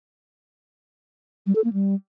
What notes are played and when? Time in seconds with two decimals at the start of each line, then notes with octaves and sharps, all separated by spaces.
1.47 G3
1.55 A4
1.64 A#3
1.73 G3